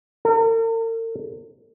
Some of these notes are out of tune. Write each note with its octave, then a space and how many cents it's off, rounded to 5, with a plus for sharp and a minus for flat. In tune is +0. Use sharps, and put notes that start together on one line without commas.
A#4 -45